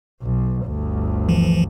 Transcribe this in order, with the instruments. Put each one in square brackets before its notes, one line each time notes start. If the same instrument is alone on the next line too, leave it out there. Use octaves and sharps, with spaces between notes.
[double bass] B1
G1 D2
[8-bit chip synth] E3 F3